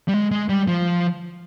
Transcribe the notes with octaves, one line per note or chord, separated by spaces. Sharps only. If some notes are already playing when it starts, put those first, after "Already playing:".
G3
G#3
G#3
G3
F3